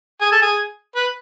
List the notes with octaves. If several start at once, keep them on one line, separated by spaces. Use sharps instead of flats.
G#4
A4
G#4
B4